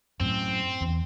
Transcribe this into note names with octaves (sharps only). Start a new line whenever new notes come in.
F#2 A2 C4
E2